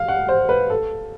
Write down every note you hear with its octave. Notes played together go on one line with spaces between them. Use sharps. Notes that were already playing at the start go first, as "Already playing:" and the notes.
Already playing: F5
F#5
C5
B4
A4